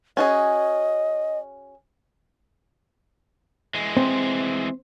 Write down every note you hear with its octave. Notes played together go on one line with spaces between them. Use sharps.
C#4 F#4 G#4 D#5
E3 G#3
C4